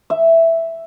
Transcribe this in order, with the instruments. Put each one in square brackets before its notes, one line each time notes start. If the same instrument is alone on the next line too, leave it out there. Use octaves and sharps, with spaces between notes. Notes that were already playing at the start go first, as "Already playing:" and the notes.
[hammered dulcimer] E5